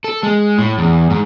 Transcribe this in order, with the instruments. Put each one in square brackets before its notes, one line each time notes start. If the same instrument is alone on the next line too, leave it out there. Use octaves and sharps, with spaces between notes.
[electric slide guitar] A4
G#3
A2
E2
G#2